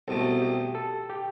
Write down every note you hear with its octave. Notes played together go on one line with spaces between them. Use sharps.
C2 B2 A3 A4
G4
A4
G4